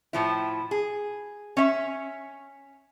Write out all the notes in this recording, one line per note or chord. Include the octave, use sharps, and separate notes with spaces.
A2 F3 E4
G#4
C#4 E5